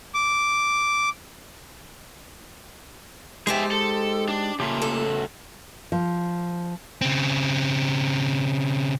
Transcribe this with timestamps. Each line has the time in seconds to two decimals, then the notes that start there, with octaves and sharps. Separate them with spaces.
0.14 D6
3.47 G#3 D#4 G4 G#4 C5 E5 A5
3.71 A4
4.28 D4
4.60 C#3 A3 A#3 F4 G4
4.82 A4
5.06 F#4
5.92 F3
7.01 C#3 C4